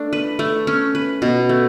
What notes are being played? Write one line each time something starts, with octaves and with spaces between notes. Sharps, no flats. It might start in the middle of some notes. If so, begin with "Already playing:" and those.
Already playing: A3 D4
B4
A3
C#4
B4
B2
A3